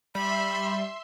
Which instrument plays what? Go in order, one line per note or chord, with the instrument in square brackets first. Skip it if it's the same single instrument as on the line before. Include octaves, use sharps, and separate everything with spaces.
[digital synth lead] G3 [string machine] E5 C6 [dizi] B5